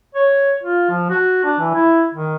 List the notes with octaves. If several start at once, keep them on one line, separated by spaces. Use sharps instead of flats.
C#5
F4
F3
F#4
D4
E3
E4
D#3